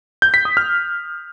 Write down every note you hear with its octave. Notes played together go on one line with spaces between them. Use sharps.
G6
B6
D#6
F6